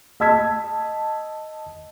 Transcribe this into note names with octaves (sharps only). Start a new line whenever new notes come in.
D#5 A5 E6 G#6 B6